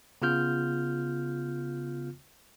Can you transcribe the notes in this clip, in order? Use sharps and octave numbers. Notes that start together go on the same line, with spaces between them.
C#3 B3 F4 F6 G6